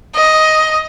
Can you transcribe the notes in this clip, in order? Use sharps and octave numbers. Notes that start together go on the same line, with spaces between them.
D#5